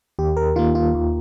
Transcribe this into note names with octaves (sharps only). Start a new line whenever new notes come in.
D#2 G4
A#4
D#3 A#3 F4
F4
D#2